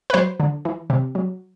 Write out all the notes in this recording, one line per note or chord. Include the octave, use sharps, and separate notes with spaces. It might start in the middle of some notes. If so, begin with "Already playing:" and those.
B4
F#3 C5
D3
E3
C3
F#3